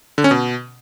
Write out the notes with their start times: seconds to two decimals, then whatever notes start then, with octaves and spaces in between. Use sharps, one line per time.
0.18 D3
0.24 C#4
0.31 B2